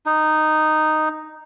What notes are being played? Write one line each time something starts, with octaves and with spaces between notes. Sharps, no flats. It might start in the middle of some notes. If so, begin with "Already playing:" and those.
D#4